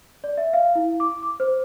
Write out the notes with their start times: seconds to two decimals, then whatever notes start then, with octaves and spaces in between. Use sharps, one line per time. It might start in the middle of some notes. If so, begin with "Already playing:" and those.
0.24 D5
0.37 E5
0.53 F5
0.75 E4
1.00 D6
1.23 D6
1.40 C5